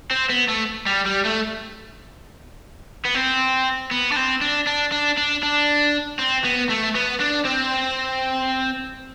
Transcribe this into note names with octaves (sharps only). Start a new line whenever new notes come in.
C4
B3
A3
G3
G3
A3
B3
C4
B3
D4
C4
D4
D4
D4
D4
D4
C4
B3
A3
B3
D4
C4